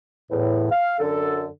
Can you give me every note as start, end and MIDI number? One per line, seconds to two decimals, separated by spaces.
0.31 0.69 40
0.31 0.69 45
0.72 0.98 77
0.99 1.47 42
0.99 1.47 50
0.99 1.47 69